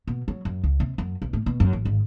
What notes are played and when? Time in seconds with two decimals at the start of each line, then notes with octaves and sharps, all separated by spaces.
0.07 B2
0.28 F#3
0.45 F#2
0.64 C#2
0.80 C3
0.98 F#2
1.22 B1
1.33 A2
1.46 B2
1.60 F#2
1.73 A1
1.85 G#1